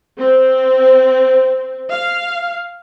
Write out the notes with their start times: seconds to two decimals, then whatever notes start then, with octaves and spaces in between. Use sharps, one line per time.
0.17 C4
1.89 F5